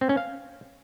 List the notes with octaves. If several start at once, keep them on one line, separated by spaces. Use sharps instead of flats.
C4
C#4
F5